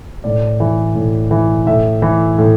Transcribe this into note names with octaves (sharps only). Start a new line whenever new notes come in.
A2 D5
E3
A2
E3
A2 E5
E3
A2